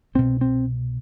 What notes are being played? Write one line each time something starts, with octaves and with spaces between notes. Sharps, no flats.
C2 B2 C4
C4